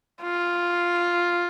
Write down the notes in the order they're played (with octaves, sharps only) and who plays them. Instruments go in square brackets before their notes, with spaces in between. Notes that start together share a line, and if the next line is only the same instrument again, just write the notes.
[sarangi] F4